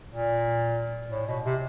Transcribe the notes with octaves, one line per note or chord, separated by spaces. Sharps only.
A#2
A2
B2
C3